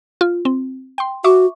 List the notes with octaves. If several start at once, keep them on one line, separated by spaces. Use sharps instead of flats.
F4
C4
G5 C6
F#4 E5 C#6 D6